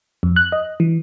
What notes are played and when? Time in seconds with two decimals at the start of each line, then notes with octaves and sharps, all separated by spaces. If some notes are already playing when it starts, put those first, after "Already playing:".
0.23 F2
0.36 F#6
0.52 D#5
0.80 E3